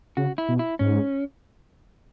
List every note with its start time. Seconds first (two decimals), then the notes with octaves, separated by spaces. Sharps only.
0.17 C#3 F#4
0.38 E4
0.49 B2
0.59 E4
0.79 G#2 C#4